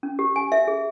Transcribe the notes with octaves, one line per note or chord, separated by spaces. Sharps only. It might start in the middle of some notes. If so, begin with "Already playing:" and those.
C#4
G4
G#5
E5
G#4